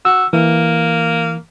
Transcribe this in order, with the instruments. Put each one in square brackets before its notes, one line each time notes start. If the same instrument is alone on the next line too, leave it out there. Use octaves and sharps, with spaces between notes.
[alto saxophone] F#4 [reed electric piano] E6
[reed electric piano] E3 [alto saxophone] A#3